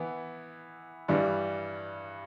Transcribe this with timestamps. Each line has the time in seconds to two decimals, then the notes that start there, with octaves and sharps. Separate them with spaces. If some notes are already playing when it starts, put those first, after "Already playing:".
Already playing: E3 B3 E4
1.08 G2 E3 G3